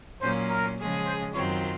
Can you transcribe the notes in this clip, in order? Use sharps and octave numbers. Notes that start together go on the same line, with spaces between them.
A#2 F#3 A#3 C#4 F4 C5
A#4
C#3 F3 G#3 C#4 G#4
C5
F#2 D#3 F#3 C4 F4 C#5